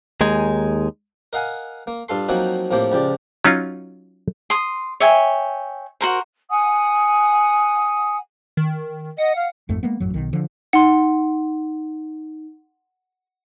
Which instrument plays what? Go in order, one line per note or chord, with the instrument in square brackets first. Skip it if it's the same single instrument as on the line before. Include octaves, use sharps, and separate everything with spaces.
[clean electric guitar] D#2 G#3 D#4 G#5
[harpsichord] A#4 D#5 F5 F#5 G#5
A#3
G2 F4 A4 C6
F3 F#3 A#3 C4 D#4 F#4
A2 F3 A#3 C4 G4
C#2 F3 G4 D5
[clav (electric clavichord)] F#3 C#4 D#4 F4
[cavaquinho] C6 D#6
C#5 E5 G5 G#5
F#4 A#4 C5
[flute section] F#5 G#5 D#6
[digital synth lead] D#3
[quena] D#5 [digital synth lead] F#5
[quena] F5
[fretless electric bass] G#1 F2 G#2 A3
G#3 A#3 B3
A1 F#2 F#3
B1 D#3
D3 F3
[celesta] D#4 [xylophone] F#5 C6